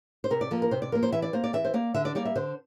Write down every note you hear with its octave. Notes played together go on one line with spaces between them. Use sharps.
C5
C3 A#4
D5
F3 A#3 A4
A#4
C3 C5
D5
F3 A#3 A#4
C5
E3 E5
D5
A#3 C5
D5
E3 E5
C5
A#3 D5
D3 E5
D5
G3 A#3 D5
E5
D3 C5